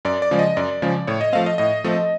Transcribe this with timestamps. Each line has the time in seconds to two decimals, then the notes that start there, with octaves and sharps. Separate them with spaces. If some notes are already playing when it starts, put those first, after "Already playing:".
0.05 F#2 D5
0.22 D5
0.31 C#3 F3 G#3
0.39 D#5
0.57 F#2 D5
0.82 C#3 F3 G#3
1.07 A2 C#5
1.21 D#5
1.33 F3 A3 C4 F5
1.46 D#5
1.58 A2 D#5
1.84 F3 A3 C4